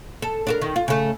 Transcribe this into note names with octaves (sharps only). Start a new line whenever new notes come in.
A4
D4 F#4 A#4
D#3
F4
C#3 A3